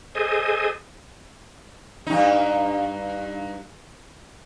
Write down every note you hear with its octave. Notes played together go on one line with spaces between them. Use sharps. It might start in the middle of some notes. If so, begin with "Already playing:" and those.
G#4 A4 C5 D#5 G#5
G2 D#4